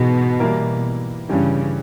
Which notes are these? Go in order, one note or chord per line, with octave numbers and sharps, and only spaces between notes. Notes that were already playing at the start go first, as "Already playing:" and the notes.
Already playing: G#2 B2 E3 G#3
E3 G3 A#3 E4 A#4
G2 C#3 E3 G3 C#4 G4